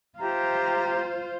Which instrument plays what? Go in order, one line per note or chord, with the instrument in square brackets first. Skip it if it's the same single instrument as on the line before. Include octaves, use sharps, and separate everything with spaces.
[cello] F4 C5 [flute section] G4 E5 A#5